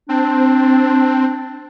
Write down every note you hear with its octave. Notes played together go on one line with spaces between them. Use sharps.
C4 D4